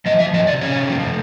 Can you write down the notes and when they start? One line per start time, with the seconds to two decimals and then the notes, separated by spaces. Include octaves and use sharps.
0.06 F3 D#5
0.19 F3 E5
0.34 F3 D#5
0.47 C3 D5
0.61 C#4 C#5
0.76 C3
0.89 F3
1.02 C3